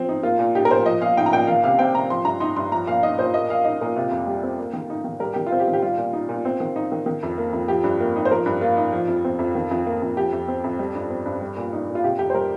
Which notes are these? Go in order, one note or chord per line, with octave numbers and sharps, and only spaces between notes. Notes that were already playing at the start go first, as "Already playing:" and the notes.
Already playing: F3 C4
D#4
A#3 F4
A#2
D#4 G4
A#4
A#2 C5
F3 D#5
A#2 F5
D#4 G5
A#5
A#2 G5
D#3 F5
C3 F5
C4 G5
C3 A#5
F3 C6
G2 A#5
D#4 C6
G2 C6
F3 A#5
A#2 F5
D#4 D#5
A#2 C5
A#3 D#5
A#2 F5
D#4 D#5
A#2 A#4
C3 F4
F2
G3
C4
A#3
D#3
D#4
D#3
G3 A#4
D#3 G4
F4
C4
G4
D#3
G4
G3 F4
A#2
D#4
A#2
C4
D#3
D#4
D#3
D#3
F2
A#3
F2
F3 G4
G2
A#3
D#4
C5
F3 A#4
G2
A#3 F4
D#4
F3
F2
C4
F2
D#3
F2
A#3
F2
F3 G4
F2
C4
F2
G3
G2
C4
G2
G3
A#2
D#4
A#2
F4
C3 G4
F2 G4
C5
G3 A#4